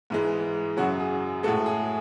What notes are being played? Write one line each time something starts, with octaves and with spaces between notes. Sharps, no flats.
G#2 E3 G#3
F#2 C#3 F#3 F#4
G#4
A2 G#3 F#4 A4
G#4